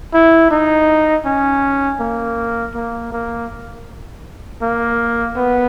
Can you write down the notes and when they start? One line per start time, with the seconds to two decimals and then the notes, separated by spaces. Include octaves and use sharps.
0.14 E4
0.50 D#4
1.25 C#4
2.00 A#3
2.75 A#3
3.12 A#3
4.62 A#3
5.37 B3